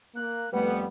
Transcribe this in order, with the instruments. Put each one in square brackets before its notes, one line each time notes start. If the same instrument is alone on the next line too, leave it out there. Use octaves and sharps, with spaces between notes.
[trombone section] A#3 [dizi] F#6
[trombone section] F2 G3 B3 [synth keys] A3 B4 [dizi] F#5